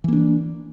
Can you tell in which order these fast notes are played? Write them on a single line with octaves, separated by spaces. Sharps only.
E3 A#3 D4